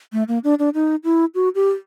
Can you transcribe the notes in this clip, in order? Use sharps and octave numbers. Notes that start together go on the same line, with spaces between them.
A3
A#3
D4
D4
D#4
E4
F#4
G4